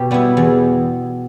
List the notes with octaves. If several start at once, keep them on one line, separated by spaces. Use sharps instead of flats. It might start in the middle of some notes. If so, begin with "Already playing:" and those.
Already playing: B2 G4
G3 B3 E4
E2